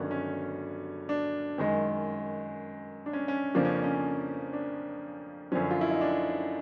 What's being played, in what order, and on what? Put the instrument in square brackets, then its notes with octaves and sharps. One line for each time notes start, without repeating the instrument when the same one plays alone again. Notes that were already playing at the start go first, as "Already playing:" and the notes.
Already playing: [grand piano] G1 G2 D#3 F#3 C#4
C#4
D4
F#2 D#3 G#3
D4
C#4
C#4
F2 C#3 F3 A#3 D4
C#4
C#4
D4
F#2 D3 F3 C#4
F4
E4
D#4
D4